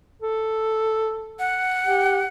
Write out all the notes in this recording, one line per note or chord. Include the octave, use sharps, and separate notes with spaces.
A4
F#5
G4